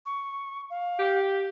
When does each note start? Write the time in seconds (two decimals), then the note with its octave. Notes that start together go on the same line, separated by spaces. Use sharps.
0.06 C#6
0.70 F5
0.99 G4